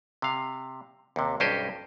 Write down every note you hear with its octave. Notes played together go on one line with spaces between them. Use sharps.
C3 F5
D#2 C3
B1 G2 C#4 G4 C5 D#5